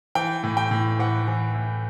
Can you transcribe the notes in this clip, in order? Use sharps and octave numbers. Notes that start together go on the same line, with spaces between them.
E3 G5
A2
G5
A2
E3 F#5
E3
A2